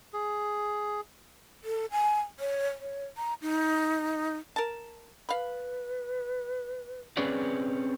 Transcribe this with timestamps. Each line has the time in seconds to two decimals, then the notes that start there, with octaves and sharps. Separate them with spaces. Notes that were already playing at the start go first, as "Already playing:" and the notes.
0.13 G#4
1.64 A4
1.92 G#5
2.40 C#5
2.80 C#5
3.17 A#5
3.42 D#4
4.56 A#4 A5
5.29 B4 F5 B5
7.17 C4 C#4 G#4 B4 C#5 D5